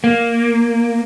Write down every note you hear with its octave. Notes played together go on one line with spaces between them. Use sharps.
A#3